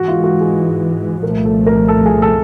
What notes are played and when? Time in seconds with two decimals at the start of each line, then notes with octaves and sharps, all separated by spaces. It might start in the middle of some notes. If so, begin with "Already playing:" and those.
Already playing: G#2 E3 G#3 F#4
0.08 F4
0.24 F#4
0.41 G#4
1.23 C2 A#2 F3 A3 A#4
1.45 A4
1.66 A#4
1.88 A4
2.06 G#4
2.22 A4